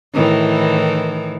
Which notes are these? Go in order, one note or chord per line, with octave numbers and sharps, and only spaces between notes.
A2 D#3 E3